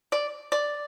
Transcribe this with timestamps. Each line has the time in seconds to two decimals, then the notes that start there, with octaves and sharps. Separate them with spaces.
0.12 D5
0.52 D5